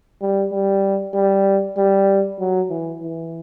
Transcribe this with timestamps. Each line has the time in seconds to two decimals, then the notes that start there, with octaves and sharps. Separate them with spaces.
0.21 G3
0.52 G3
1.14 G3
1.77 G3
2.40 F#3
2.70 E3
3.02 E3